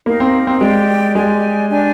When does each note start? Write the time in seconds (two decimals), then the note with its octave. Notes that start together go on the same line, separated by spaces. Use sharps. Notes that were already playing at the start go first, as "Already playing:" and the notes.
0.06 A#3 D#4 G4 A#4 F5
0.20 C4
0.47 C4
0.60 G#3 G4 D5 G5
1.14 G#3 G4 D5 G#5
1.69 D4 G4 D5 G#5